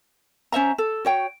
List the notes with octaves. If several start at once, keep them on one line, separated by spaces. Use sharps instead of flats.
C#4 C5 E5 A#5
A4
F#4 C#5 G5